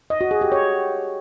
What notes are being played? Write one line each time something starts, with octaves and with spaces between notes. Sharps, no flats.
D#5
F#4
G#4
G4
C#5